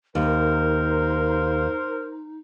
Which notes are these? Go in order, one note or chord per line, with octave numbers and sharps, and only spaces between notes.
D#2 D#4 A#4 C5